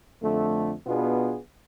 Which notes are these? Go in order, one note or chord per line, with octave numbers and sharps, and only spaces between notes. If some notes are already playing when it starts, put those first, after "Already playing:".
F2 D3 A3
B2 B3 D4 F4 G#4